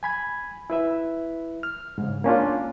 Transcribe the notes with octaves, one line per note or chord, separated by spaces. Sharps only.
G#5 B5 G#6
E4 B4 E5
F6
G#2 C#3
A#3 C#4 D4 F4